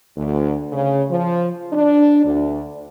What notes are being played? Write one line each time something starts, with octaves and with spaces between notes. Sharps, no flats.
D2
C#3
F3
D4
D2